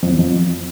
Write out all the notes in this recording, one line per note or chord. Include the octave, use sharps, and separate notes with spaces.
F2
E2
F2